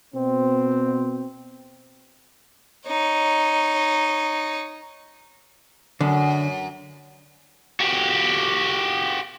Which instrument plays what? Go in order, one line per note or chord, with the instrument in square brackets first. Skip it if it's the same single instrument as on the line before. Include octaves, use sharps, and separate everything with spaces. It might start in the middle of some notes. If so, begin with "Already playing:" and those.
[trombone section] B2 C4
[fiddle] D#4 C#5
[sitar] F#2 [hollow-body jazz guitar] D3
[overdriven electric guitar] F#4 G4